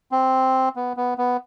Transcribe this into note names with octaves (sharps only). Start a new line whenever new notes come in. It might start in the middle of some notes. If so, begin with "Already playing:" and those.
C4
B3
B3
B3